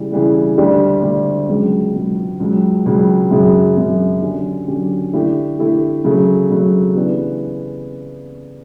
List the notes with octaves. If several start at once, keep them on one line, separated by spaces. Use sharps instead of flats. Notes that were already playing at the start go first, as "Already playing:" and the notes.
Already playing: C#3 E3 G3
C#3 E3 G3
D2 D3 G3 D4 G4
D2 D3 G3 D4 G4
C#2 C#3 F#3
C#2 C#3 F#3
C#2 C#3 F#3
C#2 C#3 F#3
F#2 C#3 F#3
F#2 C#3 F#3
D3 F#3 C#4 G4
D3 F#3 C#4 G4
D3 A3 E4 G4
D3 A3 E4 G4
C#3 F#3 A3
C#3 F#3 A3
C#3 E3 B3 D4 G4